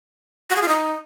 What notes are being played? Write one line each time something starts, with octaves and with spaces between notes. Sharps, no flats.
F#4
G#4
F4
D#4